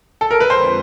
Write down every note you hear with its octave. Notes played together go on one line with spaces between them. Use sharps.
A4
A#4
B4
F2 D3 F3 G#3 C4 C5